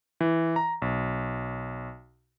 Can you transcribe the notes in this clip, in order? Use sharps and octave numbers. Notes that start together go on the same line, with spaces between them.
E3
A#5
B1